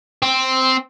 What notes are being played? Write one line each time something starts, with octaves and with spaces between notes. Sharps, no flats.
C4